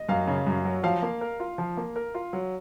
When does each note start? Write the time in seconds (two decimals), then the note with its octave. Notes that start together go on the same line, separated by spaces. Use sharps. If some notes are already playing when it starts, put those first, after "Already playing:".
Already playing: D#5
0.09 F#2 F5
0.28 C#3
0.47 F#2
0.65 F#3
0.83 F3 F5
1.02 A#3
1.21 A#4
1.40 F4
1.58 F3
1.77 A#3
1.96 A#4
2.15 F4
2.33 F#3